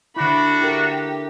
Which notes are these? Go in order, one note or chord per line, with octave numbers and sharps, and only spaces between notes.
D3 D4 E4 F#4 B5
E4 G4 A#4